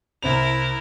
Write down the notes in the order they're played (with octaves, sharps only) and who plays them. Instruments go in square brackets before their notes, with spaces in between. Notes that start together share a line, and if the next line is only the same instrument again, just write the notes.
[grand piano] C2 C4 F7 [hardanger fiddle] E4 A#4